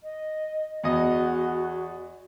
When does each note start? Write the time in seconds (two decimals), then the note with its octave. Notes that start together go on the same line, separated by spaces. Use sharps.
0.03 D#5
0.84 E2 F#4 D#5